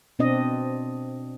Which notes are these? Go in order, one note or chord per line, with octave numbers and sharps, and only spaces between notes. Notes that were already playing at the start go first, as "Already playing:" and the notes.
B2 C4 D4 D#5